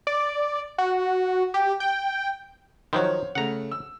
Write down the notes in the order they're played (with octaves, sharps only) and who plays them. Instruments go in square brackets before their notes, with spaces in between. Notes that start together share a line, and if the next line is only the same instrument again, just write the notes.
[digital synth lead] D5
F#4
G4
G5
[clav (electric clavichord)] D#3 F3 F#3 [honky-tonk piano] C5 C#5
[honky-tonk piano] C#3 A3 [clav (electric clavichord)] F#5 A#5
[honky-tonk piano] E6